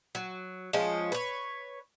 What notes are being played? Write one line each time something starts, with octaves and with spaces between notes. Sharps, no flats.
F#3
F3 G#3 C#4 D#5
B4 C#5